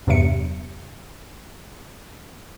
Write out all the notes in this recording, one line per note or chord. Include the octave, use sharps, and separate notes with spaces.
E2 G2 C3 F#3 E5 C#7